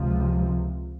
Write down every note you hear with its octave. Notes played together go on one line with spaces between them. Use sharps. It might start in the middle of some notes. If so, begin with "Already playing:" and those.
Already playing: C#2 C3 F3